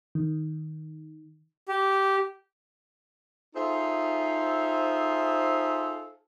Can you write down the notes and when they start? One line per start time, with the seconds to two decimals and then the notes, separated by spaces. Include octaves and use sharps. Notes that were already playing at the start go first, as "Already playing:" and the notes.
0.15 D#3
1.69 G4
3.55 D#4 F4 G#4 A4 C5 E5